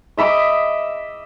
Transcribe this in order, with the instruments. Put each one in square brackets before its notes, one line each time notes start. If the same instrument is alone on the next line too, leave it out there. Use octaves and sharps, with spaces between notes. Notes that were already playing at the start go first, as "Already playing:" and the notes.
[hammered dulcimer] D#5 E5 B5 D6